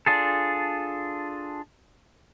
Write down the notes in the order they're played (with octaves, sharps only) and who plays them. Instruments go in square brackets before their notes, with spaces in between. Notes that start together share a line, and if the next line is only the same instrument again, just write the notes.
[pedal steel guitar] D4 F4 G#4 A4